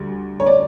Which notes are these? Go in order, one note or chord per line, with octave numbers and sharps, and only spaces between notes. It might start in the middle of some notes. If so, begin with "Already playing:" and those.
Already playing: D2 G3
C#5
D5